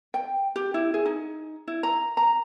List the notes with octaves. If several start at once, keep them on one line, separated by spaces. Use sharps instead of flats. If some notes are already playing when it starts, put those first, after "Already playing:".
G5
G4
E4
G#4
D#4
E4
A#5
A#5